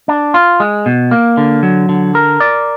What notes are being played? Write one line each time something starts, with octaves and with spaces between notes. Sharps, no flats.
D4
F4
G#3
B2
A#3
D3
F#3
D3
A#4
D5